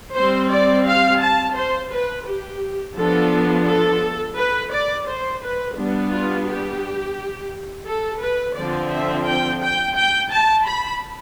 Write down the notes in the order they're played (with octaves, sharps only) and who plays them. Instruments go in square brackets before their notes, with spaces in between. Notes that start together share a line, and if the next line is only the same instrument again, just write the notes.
[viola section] G3 C4 C5
D5
F5
A5
C5
B4
G4
F3 B3 D4 A4
A4
B4
D5
C5
B4
G3 B3 D4
F4
G4
A4
B4
D3 F3 C4 D5
E5
G5
G5
G5
A5
B5